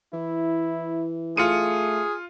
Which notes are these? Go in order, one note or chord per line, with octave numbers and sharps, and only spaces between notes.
E3 E4
A3 F4 G#4 C#7 D#7